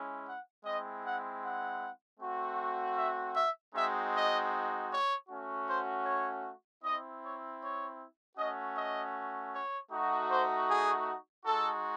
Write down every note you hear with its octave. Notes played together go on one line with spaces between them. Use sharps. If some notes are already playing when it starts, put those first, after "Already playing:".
Already playing: G#3 C#4 E4
F#5
G#3 C4 E4 D#5
F#5
F#5
A3 C4 F#4
E5
E5
G#3 C4 D#4 F#4 E5
D#5
C#5
A3 C#4 F#4
C5
C#5
C4 E4 D#5
C#5
C#5
A3 C#4 F#4 D#5
D#5
C#5
A3 D#4 F#4
C5
G#4
G#3 D#4 F#4 A4